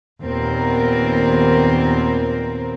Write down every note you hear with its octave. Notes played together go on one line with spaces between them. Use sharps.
D#2 A#2 B3 C4 A#4